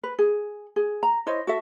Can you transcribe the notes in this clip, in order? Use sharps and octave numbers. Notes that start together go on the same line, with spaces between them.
B4
G#4
G#4
A#5
E4 C5 C#5 D#5
F#4 A4 E5